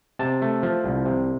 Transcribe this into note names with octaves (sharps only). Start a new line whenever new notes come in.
C3 A5
A3
F3
C2
C3